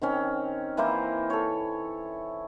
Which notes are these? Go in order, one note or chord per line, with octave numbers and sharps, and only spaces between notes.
D#3 C4 C#4
E3 A#3 E4 C5
A4 C#5